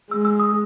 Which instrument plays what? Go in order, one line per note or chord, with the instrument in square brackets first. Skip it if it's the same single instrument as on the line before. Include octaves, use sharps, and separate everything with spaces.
[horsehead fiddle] G#3 [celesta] E6
[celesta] E6
D#6